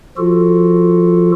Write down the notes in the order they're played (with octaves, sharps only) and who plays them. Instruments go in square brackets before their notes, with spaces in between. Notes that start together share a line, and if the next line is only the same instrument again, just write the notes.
[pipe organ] F3 F4 F#4 A4